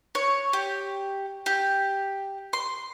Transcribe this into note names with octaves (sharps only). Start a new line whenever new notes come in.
C#5
G4
G4
C6